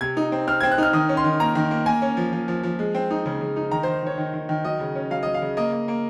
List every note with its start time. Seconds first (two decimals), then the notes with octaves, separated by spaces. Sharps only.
0.01 C3 G#6
0.17 D#4
0.32 C4
0.47 C4 F6
0.61 C4 G#6
0.71 F#6
0.78 D#4 F6
0.93 D#3 D#6
1.09 C#4
1.17 C6
1.24 D#3
1.40 A#3 A#5
1.55 D#3
1.71 A#3
1.86 A#3 G#5
2.02 C#4
2.17 F3
2.33 F3
2.48 F3
2.63 F3
2.79 G#3
2.95 C4
3.10 D#4
3.26 C#3
3.41 C#3
3.56 D#4
3.71 D#3 A#5
3.83 D#3 C5
4.03 D#3 C#5
4.18 D#3
4.34 D#3
4.49 D#3
4.64 F#3 D#5
4.80 C#3
4.95 C#4
5.11 F#3 F5
5.23 F#3 D#5
5.34 F5
5.42 C#3
5.57 A#3 D#5
5.72 A#3
5.88 A#3